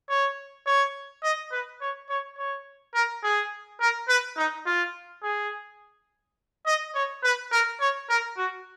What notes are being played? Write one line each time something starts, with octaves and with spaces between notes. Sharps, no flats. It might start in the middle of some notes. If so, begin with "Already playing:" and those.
C#5
C#5
D#5
B4
C#5
C#5
C#5
A#4
G#4
A#4
B4
D#4
F4
G#4
D#5
C#5
B4
A#4
C#5
A#4
F#4